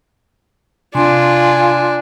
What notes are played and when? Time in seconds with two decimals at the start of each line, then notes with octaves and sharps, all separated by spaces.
0.95 C3 D4 F4 G#5 C6